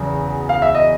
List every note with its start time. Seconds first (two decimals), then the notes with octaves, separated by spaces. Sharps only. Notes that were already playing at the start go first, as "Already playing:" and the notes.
Already playing: E2 C#3 F#3
0.49 F5
0.62 E5
0.75 D#5